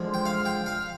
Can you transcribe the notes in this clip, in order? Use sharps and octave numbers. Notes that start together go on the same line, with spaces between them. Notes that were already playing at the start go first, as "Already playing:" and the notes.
Already playing: D3 F3 G#3
G5
F5
G5
F5